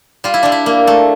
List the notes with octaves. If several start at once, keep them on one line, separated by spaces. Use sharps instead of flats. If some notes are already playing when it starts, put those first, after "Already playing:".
G3 F4
E4
G3 D4
E4
A#3
A3